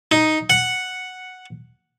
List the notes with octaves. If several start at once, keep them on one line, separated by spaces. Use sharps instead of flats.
D#4
F#5